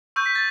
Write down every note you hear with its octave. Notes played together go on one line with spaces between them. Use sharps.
C#6 E6 G6
B6
A6